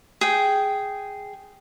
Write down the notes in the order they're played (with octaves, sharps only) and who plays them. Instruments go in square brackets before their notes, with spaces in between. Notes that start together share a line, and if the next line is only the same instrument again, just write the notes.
[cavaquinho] G#4 G5